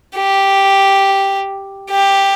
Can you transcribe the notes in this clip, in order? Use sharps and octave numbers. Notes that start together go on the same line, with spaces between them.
G4
G4